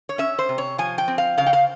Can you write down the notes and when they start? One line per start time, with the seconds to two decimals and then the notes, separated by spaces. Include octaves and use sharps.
0.09 C#5
0.18 C#4 E5
0.39 C5
0.49 C3
0.58 C#5
0.78 F3 G#5
0.98 G5
1.08 C4
1.18 F5
1.38 C#3 F5
1.47 G5
1.53 F5